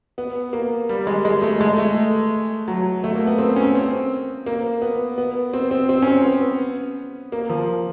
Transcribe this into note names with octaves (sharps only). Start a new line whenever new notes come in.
B3
A#3
G3
G#3
G#3
A3
G#3
A3
F#3
A3
A#3
B3
C4
C#4
C4
A#3
B3
B3
C4
C4
C4
C#4
C4
B3
A#3
F3